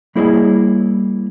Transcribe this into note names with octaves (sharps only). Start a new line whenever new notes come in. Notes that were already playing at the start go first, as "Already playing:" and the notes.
G3 A#3 E4 G#4 C#5 D#5